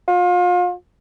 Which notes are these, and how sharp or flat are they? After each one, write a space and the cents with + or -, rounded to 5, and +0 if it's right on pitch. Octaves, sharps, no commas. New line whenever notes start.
F4 +35